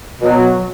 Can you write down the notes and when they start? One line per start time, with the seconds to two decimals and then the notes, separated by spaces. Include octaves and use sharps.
0.21 B2 F#3